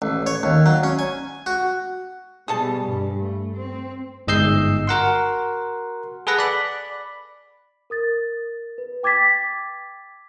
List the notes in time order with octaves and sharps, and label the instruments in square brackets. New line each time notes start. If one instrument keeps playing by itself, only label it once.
[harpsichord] A1
C#5
D#2
F#3
C#4
G#5
F#4
[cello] B2 G3 [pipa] G#4 A4 A5
[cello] G2
A3
C4
[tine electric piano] G1 G#2 D#5 E6 G6 C7
F#4 A#4 F#5 C6
G#4 A4 B4 F#5 A#6
D5 B5
[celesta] A#4 D#6 A6
B4
G5 D6 G#6 A6 B6